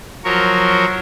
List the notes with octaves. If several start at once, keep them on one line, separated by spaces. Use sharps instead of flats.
F3 F#3 A#4 C#5